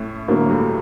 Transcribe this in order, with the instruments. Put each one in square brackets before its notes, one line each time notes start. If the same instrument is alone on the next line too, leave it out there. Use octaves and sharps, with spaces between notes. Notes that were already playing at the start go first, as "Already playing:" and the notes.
Already playing: [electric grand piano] A2 A3 C#4
[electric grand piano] A2 A3 [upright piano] D3 F#3 A#3
[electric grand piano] G2 G3